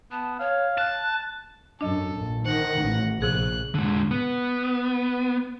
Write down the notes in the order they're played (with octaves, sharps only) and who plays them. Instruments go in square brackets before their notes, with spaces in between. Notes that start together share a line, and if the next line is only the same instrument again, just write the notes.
[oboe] B3 [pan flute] A5
[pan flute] C#5 [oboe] F5
[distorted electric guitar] A5 [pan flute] F#6
[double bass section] F#2 [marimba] D4 D#5 [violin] A4
[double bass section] A#1
[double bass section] D#3 [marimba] C5 [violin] F#5 A#6
[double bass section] A1
[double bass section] A#1 [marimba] C3 F3 G#4 [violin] F#6
[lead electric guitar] D3 G#3
B3